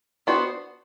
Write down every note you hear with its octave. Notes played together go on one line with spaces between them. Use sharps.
B3 D4 F#4 C5